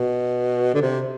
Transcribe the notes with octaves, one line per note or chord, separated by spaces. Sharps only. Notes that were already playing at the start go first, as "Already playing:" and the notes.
Already playing: B2
D3
C3